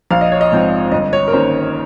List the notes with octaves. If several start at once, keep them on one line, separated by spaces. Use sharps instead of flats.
A#1 F5
D#5
C#5
D#5
G#2 F3 C4
G1 D#5
C#5
A#4
D#3 A#3 C#4 C5